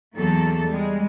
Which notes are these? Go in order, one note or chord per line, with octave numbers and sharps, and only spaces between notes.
E2 F#3 A#3 A4
G3 G#3